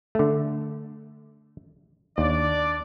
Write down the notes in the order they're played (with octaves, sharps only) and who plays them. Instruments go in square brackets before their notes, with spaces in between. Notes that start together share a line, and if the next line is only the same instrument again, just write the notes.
[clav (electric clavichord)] D3 A3
[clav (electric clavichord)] D#2 [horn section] D4 D5